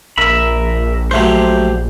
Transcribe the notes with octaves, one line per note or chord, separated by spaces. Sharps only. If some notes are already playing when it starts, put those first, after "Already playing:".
A#1 A#4 E5 B5
F#3 A3 C#4 G4 C5